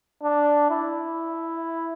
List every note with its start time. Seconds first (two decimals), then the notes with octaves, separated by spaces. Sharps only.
0.23 D4
0.71 E4